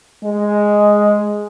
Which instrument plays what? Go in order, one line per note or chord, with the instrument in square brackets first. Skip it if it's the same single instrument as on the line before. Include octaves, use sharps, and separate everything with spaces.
[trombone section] G#3